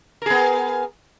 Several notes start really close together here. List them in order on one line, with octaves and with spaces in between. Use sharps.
A#4 G#4 B3